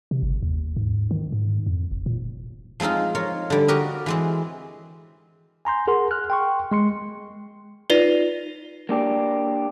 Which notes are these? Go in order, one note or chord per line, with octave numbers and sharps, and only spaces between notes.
C3
G1
D#2
G#2
D#3
G#2
F2
F1
A#2
F3 G#3 C4 D#4 F4
F4 A#4 C#5
D3 G3
F#4 G4 A#4 D#5
E3 G#3 C4
G#5 A#5 C6 G6
G#4 A#4 F#5 C6
F6 F#6
G5 C6 C#6
G#3 C6 C#7
D#4 F4 B4 D5
A#3 D4 G4